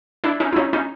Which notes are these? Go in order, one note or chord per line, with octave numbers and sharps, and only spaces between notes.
D4 E4
C#4 D#4
E4
C#4 D#4
C#4 D#4